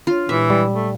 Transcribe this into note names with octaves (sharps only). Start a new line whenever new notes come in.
D4 F4 C#5
A#2 E3 G#3 G4 E5
G3
A3